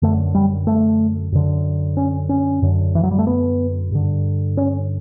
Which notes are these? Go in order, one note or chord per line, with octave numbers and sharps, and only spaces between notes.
F#2 D3 A3
G3
A3
F#2 D3
C#4
C#4
F#2 D3
E3
F#3
G3
A3
B3
G2 D3
C#4